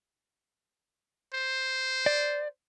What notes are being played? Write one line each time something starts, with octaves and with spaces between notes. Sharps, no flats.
C5
D5